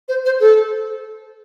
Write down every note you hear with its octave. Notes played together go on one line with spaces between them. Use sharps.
C5
C5
A4